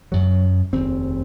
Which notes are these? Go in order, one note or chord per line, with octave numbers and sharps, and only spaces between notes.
F#1 F#2 C#3 F#3
F1 D#2 C#3 C4